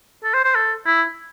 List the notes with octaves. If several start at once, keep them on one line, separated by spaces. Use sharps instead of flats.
A4
C5
C5
A4
E4